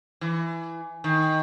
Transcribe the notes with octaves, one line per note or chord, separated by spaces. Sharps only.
E3
D#3